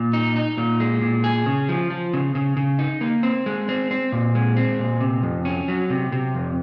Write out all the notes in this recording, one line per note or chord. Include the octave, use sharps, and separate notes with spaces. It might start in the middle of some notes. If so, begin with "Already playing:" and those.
Already playing: A#2
D#4
D#4
A#2
G#3
A#2
G#4
C#3
F3
F3
C#3
C#3
C#3
D#4
A#3
C4
G#3
C4
C4
A#2
G#3
C4
A#2
C3
F2
C#4
F#3
C3
C3
F2